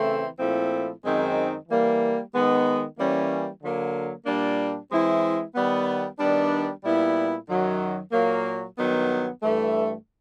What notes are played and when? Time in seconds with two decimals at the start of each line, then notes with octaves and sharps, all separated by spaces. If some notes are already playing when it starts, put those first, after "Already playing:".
Already playing: C#3 E3 A3 C4 E4
0.39 A#2 F3 A3 C4 E4
1.03 F#2 D#3 G#3 C4 D#4
1.68 E3 G3 A#3
2.33 D#3 G#3 B3 D#4
2.97 E3 G3 A#3 C#4
3.61 D3 F#3 A#3
4.26 A#2 G3 A#3 D4
4.91 E3 G#3 C4 E4
5.55 D#3 G3 B3
6.20 D#3 G3 B3 D4
6.83 A#2 G3 B3 E4
7.48 F#2 D#3 F#3
8.12 A#2 F#3 A#3
8.77 G2 D#3 F#3 B3
9.42 G2 E3 A3